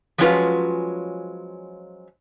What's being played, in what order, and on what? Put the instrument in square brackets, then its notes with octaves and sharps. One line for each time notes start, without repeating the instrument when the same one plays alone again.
[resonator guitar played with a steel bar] F3 F#3 G#3 C#4 F4 B4